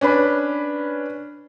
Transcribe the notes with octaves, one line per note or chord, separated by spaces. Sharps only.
C#4 D4 B4 B5